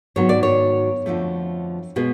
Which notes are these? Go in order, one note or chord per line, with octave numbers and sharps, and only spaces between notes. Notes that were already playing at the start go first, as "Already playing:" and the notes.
G#2 D#3 F#3 B3 C#5
D5
C#5
F2 D3 F3 A3
B2 G#3 B3